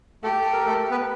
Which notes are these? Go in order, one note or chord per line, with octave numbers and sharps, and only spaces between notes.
A3 G4 A4
A4
A#4
A3 A4
B3 B4